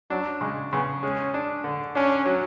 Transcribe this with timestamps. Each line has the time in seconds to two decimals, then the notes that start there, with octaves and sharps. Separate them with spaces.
0.10 F#3 D4
0.41 C#3 G#3
0.72 C#3 B3
1.03 G#3 C#4
1.34 D4
1.64 D3
1.95 C#4 D4
2.26 F#3